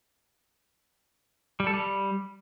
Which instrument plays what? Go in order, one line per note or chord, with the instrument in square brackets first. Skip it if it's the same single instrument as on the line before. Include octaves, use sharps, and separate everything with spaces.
[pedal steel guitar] G3
A4
G3